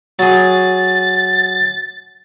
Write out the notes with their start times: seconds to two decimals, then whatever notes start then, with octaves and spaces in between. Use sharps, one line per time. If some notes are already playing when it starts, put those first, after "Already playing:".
0.19 F#3 G#4 A6